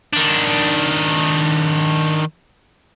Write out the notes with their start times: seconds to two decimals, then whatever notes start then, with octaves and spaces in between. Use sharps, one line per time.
0.13 D#3 D4